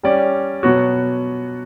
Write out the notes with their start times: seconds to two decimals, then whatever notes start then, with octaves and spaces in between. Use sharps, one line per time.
0.03 G3 C#4 G4 D5
0.63 B2 F#3 B3 F#4 C#5